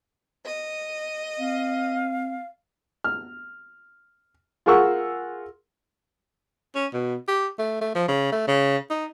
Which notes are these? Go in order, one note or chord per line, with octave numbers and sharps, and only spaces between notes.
D#5
C4 F5
F6
F4 G#4 A#4 F#5 C#6 E6
C#4
B2
G4
A3
A3
F3
C#3
A3
C#3
D#4